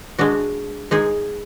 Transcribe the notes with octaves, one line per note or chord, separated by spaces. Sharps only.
G#3 D4 F#4
G#3 D#4 G#4